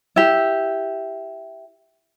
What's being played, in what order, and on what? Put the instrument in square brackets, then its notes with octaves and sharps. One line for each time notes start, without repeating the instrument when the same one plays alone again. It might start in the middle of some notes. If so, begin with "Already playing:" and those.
[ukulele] E4 G4